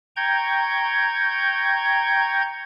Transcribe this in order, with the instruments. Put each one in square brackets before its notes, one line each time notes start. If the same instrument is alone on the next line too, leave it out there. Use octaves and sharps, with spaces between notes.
[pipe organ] G5 A#5 C#6 G6 G#6